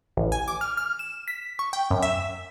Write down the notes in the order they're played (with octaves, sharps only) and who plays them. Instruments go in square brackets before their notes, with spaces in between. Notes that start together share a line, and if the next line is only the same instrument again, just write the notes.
[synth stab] A1
G#5
D6
F6
F6
E7
B6
C#6
G5
F#2
E5